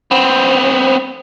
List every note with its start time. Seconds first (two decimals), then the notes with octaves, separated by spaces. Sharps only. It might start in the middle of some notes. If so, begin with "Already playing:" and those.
0.11 B3 C4